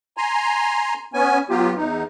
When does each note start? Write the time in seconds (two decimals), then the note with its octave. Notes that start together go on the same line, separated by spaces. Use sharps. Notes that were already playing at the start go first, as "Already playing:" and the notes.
0.17 G#5 A#5 C6
1.14 B3 C#4 G#5
1.50 F#3 B3 F4 G4
1.76 E2 D#4